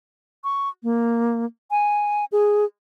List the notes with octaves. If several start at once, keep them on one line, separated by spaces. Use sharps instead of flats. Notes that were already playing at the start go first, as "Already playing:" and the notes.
C#6
A#3
G#5
G#4